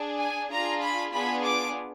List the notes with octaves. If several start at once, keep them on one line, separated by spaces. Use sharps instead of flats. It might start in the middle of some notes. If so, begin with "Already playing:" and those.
Already playing: D4 G#4
G#5
D4 F4 G#4 A#5
B5
B3 D4 F4 G#4 B5
D6